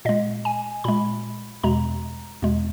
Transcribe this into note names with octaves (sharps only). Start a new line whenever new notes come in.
A#2 G#3 D#5
G#5
A#2 G#3 B5
E2 B2 G#3 A#5
E2 B2 G#3